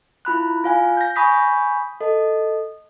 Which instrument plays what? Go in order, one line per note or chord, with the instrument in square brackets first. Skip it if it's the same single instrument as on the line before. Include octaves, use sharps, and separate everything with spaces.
[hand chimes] E4 F4 B5 F#6
F4 F5 G#5
G6 A#6
G#5 B5 C#6 D#6 G6 B6
A4 D#5